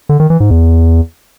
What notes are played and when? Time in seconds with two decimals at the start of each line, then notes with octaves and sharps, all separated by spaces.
0.09 D3
0.20 D#3
0.30 E3
0.40 G#2
0.51 E2